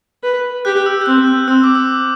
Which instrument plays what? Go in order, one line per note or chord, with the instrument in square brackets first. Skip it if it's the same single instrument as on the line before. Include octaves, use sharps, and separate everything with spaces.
[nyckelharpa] B4
[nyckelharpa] G4 [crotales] F#6
[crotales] F#6
E6
G6
[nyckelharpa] C4 [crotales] F#6
[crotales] F#6
[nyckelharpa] C4 [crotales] E6
[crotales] D6
E6